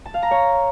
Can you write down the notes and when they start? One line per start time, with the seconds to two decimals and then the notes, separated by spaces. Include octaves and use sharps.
0.06 A5
0.14 F5
0.23 A#5
0.31 C#5